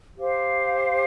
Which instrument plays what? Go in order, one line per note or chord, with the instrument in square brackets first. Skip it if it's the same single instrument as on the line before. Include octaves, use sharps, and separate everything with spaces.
[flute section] G4 C5 F5